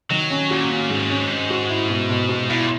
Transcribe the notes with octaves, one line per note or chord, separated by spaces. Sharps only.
D#3 F#3
C#4
A#2 F#4
C#4
G#2 G#3
C#4
C#4
F#4
E4
B2
B2
B2
A#2 E4